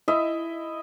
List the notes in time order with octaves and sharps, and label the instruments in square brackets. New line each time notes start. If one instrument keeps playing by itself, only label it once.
[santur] E4 D#5 E5